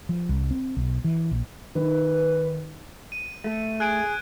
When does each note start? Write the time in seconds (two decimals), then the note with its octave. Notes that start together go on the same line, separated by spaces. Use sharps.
0.09 F3
0.29 C2
0.51 C4
0.77 B1
1.04 E3
1.31 A#1
1.75 D#3 B4
3.12 D#7
3.44 A3
3.80 G#4 F#6 G#6 D7